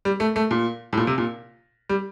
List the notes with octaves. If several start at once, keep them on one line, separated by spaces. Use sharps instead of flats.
G3
A3
A3
A#2
A2
A#2
C3
A#2
G3